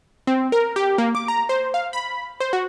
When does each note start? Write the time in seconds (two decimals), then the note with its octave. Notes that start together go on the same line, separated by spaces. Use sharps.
0.27 C4
0.52 A#4
0.76 G4
0.98 A#3
1.15 D6
1.28 A#5
1.49 C5
1.74 F5
1.93 B5
2.40 C5
2.53 F#4